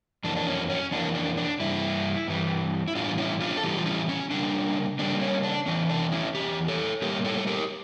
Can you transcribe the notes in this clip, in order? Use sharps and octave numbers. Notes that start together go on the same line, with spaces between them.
F2 E3 A#3 D4
D4
C#4
C#4
F2 E3 A#3 D4
D4
D4
G2 E3 G3 E4
G2 E3 G3
E4
A2 E3 G3 D4 F4
C#4 E4
D4 F4
A4
A2 E3 G3 E4 G4
F4
C#4 E4
C#4
C#3 G3 A#3 D4
C#3 G3 A#3 D4
C#4
D4
E2 E3 C#4
D4
C#4 E4
E2 E3 G4
A4 C#5
A2 G3 A#3 G4 A#4
A4 C#5
A4
G4 A#4